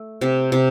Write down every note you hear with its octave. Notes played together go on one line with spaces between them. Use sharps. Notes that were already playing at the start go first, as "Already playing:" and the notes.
Already playing: A3
C3
C3